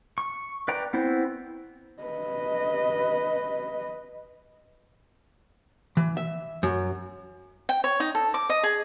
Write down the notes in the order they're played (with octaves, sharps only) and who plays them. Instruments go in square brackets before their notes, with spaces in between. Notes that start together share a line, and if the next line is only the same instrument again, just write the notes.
[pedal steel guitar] C#6
B4 D5 G5 A#5
B3 C4 E4 C5
[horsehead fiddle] B4 D#5
[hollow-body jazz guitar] E3
E5
F#2
[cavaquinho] G5
C#5
D#4
A4
D6
D#5
G#4